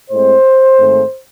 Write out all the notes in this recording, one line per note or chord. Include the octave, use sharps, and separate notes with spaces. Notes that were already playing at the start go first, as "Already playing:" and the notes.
A2 G#3 C4 C5
G#2 D#3 A3 C4